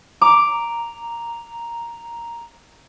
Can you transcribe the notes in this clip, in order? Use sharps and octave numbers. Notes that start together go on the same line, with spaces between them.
A#5 D6